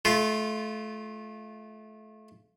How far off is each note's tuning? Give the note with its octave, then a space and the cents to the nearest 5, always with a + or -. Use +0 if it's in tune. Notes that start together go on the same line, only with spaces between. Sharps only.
A3 -30 F4 -5